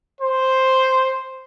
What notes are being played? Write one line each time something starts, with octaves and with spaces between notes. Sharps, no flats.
C5